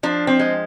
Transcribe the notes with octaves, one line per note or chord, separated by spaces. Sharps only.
F3 D4
C4
G#3